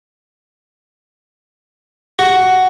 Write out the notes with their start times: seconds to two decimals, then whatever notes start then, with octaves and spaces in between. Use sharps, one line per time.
2.19 F#4